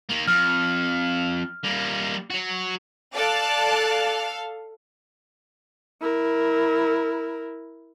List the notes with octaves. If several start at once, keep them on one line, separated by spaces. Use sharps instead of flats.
D#3 A#3
F2 F6
G3 A#3
F#3 F#4
A4 D5 F5 A5 F#6
E4 A#4